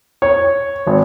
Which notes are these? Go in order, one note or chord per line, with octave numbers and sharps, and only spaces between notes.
C#5
G#1